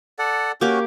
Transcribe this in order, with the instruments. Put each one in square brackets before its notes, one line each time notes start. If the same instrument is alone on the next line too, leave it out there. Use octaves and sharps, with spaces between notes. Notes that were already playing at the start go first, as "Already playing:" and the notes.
[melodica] A4 D5 F#5
[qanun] A#3 G4 D6 [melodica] C#4 F#4